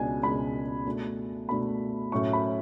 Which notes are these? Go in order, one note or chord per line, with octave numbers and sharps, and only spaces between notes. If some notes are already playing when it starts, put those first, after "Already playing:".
Already playing: C#2 B2 G#3 D4 G#5
C#2 B2 G#3 D4 B5
B2 A3 D4
B2 A3 D4 B5
A2 F#3 C#4 E4 C#6
B5